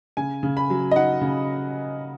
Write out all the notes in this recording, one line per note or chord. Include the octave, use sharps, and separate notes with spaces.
C#3 G#5
C#3
B5
F#3
D#5
D#4 F#5
C#3